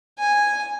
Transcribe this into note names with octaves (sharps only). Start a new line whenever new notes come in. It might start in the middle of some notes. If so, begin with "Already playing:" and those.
G#5